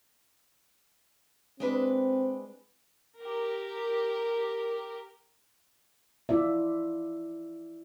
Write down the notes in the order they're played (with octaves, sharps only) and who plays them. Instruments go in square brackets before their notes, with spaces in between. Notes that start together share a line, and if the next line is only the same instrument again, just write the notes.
[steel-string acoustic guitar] G#3 D4 B4 [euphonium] C4
[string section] G4 A#4
[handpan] E4 F4 D5 E5